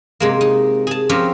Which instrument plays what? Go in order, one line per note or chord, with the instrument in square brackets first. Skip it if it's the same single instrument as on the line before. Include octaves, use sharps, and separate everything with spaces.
[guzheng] C3 G#3 A#3
D#4
G#4 A5
F3 C4 C#4 G4 A#4